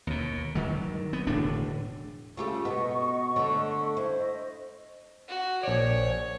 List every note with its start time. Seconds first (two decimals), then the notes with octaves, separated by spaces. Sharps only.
0.07 D#2 B2
0.55 G2 D#3 F#3
1.13 B3
1.27 E1 A2 D3 D4
2.37 C#3 A3 F4 G4 C#6
2.65 B2 B3 D#5
3.36 D3 A3 C#5
3.97 E4 C5
4.19 D#5
5.29 F#4
5.63 A#1 C#5 D5